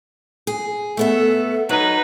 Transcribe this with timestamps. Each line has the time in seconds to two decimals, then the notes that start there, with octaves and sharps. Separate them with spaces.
0.47 G#4
0.97 A3 B3 A4 E5
1.69 F#3 D#4 B4